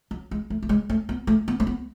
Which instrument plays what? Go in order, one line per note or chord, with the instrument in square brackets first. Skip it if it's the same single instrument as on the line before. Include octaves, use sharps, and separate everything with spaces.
[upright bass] F#3
G#3
A3
A3
G#3
A3
B3
A3
B3
A3
B3